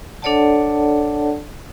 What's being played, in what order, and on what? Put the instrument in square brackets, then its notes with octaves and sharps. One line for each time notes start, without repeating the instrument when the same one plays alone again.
[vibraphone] D4 A4 C#5 D5 F#5 A5